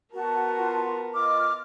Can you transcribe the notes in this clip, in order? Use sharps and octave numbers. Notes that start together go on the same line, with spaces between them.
B3 F#4 A#4 A5
F4
F4 D#5 D6 F6